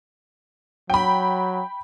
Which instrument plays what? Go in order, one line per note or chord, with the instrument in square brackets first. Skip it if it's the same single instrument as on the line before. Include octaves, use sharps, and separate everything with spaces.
[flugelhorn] F#3 [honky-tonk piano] G5 B5